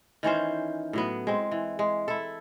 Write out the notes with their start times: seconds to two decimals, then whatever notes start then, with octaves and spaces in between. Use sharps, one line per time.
0.23 D#3 E3 C#4 C5
0.93 A2 F#3 B3
1.27 G#3 C4
1.51 E3
1.79 G#3
2.08 E4 A4